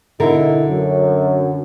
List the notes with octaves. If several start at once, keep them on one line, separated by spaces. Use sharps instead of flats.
B2 D3 D#4 E4 A#4
F#2